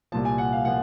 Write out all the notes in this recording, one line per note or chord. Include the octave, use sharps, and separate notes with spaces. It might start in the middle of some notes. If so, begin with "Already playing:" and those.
C2 A#2 F3 A5
G#5
F#5
F5
A#2 F3 F#5